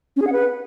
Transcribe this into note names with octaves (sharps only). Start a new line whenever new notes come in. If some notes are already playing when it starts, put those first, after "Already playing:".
C#4
G#4
F#5
B4